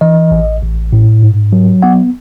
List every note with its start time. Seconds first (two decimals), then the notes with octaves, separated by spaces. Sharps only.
0.01 E3 D#5
0.31 A1
0.62 A1
0.93 A2
1.22 G#2
1.53 F#3
1.82 B3 F#5